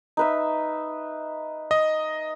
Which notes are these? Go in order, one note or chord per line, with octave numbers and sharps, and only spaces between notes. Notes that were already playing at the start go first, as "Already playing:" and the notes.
D#4 B4 E5
D#5